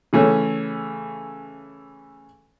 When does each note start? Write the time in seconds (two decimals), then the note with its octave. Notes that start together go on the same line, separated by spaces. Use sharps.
0.13 C#3 E3 A3 C#4